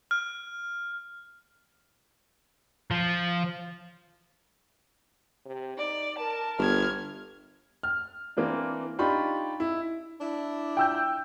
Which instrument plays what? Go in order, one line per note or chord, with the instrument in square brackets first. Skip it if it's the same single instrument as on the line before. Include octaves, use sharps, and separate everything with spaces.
[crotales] F6
[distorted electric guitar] F3
[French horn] C3
[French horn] D#4 [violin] D5
[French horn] A#4 [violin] A5
[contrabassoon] G1 [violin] F6 G#6
[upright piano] F6
E3 A#3 C4 D4
D4 D#4 F4 G4 B5 C#6
E4
[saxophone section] D4 E4
[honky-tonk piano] G5 E6 G6